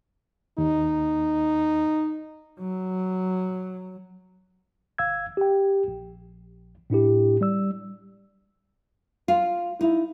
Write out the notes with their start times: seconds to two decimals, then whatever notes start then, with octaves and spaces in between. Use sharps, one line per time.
0.58 D#2 D#4
2.60 F#3
4.98 G1 F5 E6 G#6
5.37 G4 G5
5.88 A#1
6.90 A2 D4 E4 G4
7.41 G3 D5 E6
9.28 F4
9.81 D#4 E4